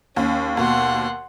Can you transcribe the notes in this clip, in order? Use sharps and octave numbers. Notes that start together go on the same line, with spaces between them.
D#2 C#4
D#2 B2 F#5 C6